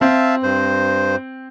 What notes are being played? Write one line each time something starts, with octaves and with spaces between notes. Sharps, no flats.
C4 E5 F5 A5
G2 C5